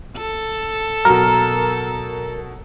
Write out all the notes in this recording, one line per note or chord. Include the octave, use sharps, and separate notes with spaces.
A4
B2 F#3 A#4